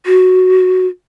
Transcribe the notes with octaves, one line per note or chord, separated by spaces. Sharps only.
F#4